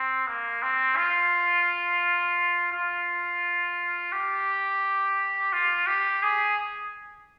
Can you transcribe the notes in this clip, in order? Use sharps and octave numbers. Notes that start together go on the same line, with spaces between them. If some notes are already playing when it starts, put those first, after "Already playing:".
Already playing: C4
A#3
C4
F4
F4
G4
F4
G4
G#4